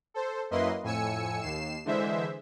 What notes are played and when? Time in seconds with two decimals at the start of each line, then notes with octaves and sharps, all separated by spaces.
0.14 A4 C5
0.51 F#2 A#3 E4 B4 D#5 C6
0.83 F2 A2 G#5 E6 C#7
1.42 D#2 C7 E7
1.85 D3 E3 G#3 C5 E5